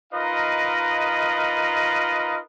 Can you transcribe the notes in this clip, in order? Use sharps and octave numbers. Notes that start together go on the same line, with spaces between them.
D#4 F4 A#4 B4 D#5 F5